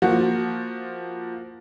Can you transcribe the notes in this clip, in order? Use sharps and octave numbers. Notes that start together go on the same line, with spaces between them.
F3 A#3 F#4